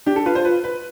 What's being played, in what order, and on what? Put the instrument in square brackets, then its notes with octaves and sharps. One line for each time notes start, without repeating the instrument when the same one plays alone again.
[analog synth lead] D4 [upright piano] G4
[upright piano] A4
[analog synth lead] F4 [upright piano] B4
[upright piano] C5
B4
B4